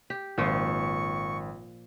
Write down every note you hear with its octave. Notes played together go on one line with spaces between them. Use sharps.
G4
G#1 A#2 F3 C#6